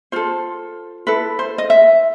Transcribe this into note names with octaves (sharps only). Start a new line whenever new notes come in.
F4 A4 C5
E4 A4 B4
C5
D#5
E5